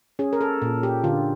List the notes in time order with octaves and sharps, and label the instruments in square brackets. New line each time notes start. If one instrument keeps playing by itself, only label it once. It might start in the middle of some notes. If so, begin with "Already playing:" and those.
[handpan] C#4 G#4
A#4
A4
A#2
G4
D3 F4